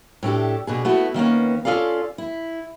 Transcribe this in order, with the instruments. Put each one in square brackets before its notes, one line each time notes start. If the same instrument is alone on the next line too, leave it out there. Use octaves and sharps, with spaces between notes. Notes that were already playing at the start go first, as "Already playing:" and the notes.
[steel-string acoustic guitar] A2 A3 D4 G4
B2 D4 G#4
A3 B3 E4 F#4
D#3 A#3 B3 C#4
C#4 F4 A4 D5 F5
E4